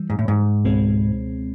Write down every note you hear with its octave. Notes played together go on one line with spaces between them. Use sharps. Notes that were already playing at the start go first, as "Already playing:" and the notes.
Already playing: E3 G3
G#2
A2
G#2
C#2 B2 G#3 C4